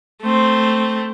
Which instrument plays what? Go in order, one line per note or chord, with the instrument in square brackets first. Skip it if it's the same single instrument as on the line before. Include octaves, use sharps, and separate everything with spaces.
[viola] A3 C4